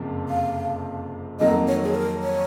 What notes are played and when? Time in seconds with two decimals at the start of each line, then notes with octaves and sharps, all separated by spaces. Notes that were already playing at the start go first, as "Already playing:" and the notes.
Already playing: F#1 F2 C3 F3
0.29 F5
1.39 F2 D#3 F#3 A#3 D#5
1.68 C#5
1.84 G#4
1.95 A#4
2.23 C#5